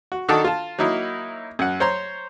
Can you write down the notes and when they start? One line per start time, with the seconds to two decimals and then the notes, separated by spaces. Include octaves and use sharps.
0.12 F#4
0.29 D#3 D4 D#4 F#4 A4 A5
0.44 F4 A5
0.79 F#3 A#3 D#4 E4
1.59 F#2 F#5
1.80 C5 C#5 A#5 C6